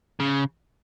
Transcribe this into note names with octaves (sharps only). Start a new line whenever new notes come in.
C#3